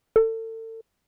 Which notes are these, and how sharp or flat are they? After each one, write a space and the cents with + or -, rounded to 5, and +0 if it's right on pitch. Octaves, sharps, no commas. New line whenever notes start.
A4 +35